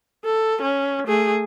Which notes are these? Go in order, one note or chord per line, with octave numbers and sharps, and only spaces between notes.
A4
C#4
A3 G#4